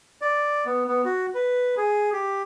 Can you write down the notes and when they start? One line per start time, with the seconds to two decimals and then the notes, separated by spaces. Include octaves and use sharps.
0.21 D5
0.66 B3
0.88 B3
1.05 F#4
1.34 B4
1.77 G#4
2.13 G4